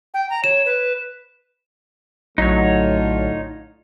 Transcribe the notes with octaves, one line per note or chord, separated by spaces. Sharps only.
G5
A#5
C#5 E7
B4
A#1 A2 D3 F#3 D#4 F4 C#5